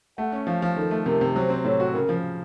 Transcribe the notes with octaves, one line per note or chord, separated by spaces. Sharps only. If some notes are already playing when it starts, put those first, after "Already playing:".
A3 F#5
C#4
F3 F5
F3
D#3 A4
A3
C3 A#4
C3
F#3 C5
C4
A2 C#5
F#4
C#3 A#4
F3